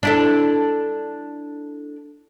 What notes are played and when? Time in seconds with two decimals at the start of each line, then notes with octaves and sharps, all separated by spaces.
0.03 D4 E4 A4